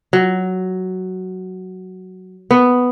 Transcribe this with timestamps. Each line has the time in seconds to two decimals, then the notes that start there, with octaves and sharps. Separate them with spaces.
0.13 F#3
2.51 B3